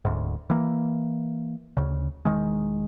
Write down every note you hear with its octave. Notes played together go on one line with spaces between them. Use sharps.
D1 D2 G#2
E3 A#3
D2 C#3
E1 C#2 D#3 G#3